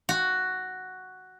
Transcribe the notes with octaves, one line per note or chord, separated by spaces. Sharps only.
F#4